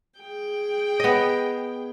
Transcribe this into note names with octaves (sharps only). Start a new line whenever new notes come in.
G#4 G5
B3 D#5